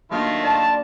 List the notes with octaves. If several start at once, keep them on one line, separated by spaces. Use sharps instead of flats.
D#3 F#3 A3 A#3 D4 F4
D5 A5